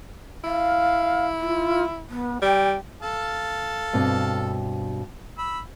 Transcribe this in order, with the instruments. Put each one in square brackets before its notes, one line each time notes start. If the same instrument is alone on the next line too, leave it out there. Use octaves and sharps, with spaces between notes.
[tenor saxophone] E4 [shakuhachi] F5
[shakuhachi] F4
B3
[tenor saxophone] G3 [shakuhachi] G5
[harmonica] A4 F5 A5
[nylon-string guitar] G2 B2 C4
[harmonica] B5 E6